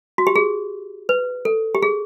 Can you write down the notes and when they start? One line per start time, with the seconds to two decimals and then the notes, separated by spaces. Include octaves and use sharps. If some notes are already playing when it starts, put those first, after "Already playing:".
0.18 F#4
0.27 G4
0.36 G#4
1.09 B4
1.45 A4
1.75 G4
1.82 G#4